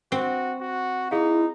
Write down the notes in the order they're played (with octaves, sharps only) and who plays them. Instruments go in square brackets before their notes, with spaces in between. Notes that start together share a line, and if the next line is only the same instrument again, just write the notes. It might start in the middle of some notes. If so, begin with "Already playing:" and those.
[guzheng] C4 [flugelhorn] F#4
[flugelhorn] F#4
[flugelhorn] D#4 [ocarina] E4 [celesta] G#4 F5